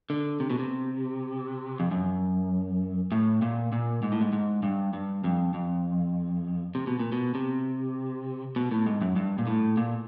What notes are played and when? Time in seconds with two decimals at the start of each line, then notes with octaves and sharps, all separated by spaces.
0.10 D3
0.40 C3
0.50 B2
0.59 C3
1.80 F2
1.91 F#2
3.12 A2
3.42 A#2
3.72 A#2
4.03 G#2
4.12 A2
4.21 G#2
4.33 G#2
4.63 G2
4.93 G2
5.24 F2
5.54 F2
6.75 C3
6.87 B2
6.99 A#2
7.12 B2
7.35 C3
8.56 B2
8.71 A2
8.86 G#2
9.01 F#2
9.16 G2
9.39 A#2
9.47 A2
9.77 A#2